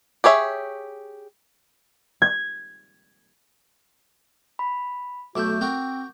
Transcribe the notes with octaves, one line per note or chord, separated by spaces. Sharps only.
G4 G#4 C#5 E5
G#6
B5
B1 A3 F#4 E5 D6 G6
C4 F#4 A#4 G5